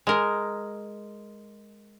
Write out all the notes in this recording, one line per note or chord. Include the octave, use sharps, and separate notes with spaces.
G#3 A#4